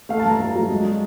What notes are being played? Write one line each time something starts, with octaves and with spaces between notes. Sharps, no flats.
A3 F5
A5
G2 A#5
A3
F#3
G#3
G#3